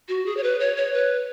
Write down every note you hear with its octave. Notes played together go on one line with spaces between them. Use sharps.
F#4
G#4
C#5
B4
C#5
C#5
B4